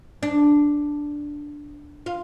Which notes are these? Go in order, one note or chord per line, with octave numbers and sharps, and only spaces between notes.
D4
F4